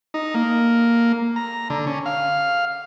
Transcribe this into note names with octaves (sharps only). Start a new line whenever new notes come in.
D#4
A#3
A#5
D3
C#4
F5